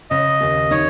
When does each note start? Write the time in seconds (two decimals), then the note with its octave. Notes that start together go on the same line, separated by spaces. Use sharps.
0.10 C#3 D#5
0.41 D#2
0.71 D#4 C#5